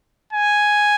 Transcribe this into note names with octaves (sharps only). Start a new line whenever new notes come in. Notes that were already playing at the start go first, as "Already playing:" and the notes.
G#5